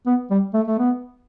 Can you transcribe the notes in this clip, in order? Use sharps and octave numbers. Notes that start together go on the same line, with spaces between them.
B3
G3
A3
A3
B3